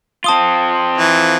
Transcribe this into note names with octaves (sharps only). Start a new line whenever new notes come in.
C4 F4 A5 D#6 G7
E3